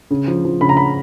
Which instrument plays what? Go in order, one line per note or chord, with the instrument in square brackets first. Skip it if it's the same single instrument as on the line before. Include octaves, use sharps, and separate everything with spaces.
[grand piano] C#3
F3
F3
C#3 B5
A#5
B5